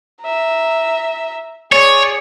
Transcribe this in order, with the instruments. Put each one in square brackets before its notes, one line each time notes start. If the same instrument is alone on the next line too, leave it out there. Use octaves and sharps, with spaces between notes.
[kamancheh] E5 A#5
[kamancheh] G#4 D5 [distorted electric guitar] C#5